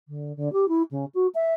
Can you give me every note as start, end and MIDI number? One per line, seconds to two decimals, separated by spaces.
0.08 0.35 50
0.37 0.51 50
0.53 0.68 67
0.68 0.83 64
0.91 1.05 49
1.14 1.27 66
1.35 1.54 76